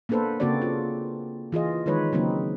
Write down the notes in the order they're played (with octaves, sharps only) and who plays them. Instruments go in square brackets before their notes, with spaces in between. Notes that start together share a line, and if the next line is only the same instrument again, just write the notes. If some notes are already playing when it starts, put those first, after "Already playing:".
[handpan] A#3 B3 D4 A4 B4 C5
C#3 A#3 C4 F#4 C5 D5
F4
E3 F4 G#4 D#5
D#3 F3 G#3 D#4 B4 C#5
C#3 F#3 A#3 C4 D#4